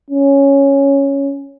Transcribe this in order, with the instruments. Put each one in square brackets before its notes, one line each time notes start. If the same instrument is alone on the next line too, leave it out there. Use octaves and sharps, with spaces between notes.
[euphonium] C#4